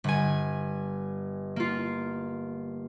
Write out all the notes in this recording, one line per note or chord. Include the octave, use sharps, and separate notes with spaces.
G1 G#5
A#3 F4